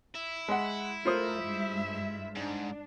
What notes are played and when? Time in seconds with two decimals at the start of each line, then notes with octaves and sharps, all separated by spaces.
0.14 E4
0.48 G#3 F#5
1.05 A3 F4 A#4 C5 D#6
1.40 G2 G#3 E5
2.35 G#2 D4